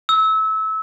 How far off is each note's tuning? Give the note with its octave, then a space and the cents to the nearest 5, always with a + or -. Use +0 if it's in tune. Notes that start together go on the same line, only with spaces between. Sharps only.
E6 -25